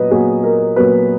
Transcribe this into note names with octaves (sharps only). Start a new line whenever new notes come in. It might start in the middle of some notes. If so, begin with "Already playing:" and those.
Already playing: A#2 F#3 B3 B4 D#5
A#2 F#3 B3 G#4
A#4
A#2 F#3 B3 B4